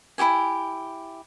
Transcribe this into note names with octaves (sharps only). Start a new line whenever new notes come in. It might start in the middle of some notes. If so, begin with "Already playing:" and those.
E4 F#4 G4 G#5